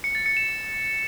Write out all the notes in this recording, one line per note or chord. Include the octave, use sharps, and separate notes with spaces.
C#7
A6
C#7
E7